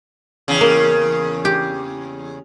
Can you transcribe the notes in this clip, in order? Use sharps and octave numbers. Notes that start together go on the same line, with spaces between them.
E2 C#3
A#3
G4